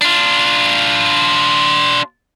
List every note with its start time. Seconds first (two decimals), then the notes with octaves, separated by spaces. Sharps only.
0.01 D4 F4